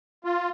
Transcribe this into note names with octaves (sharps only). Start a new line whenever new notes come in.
F4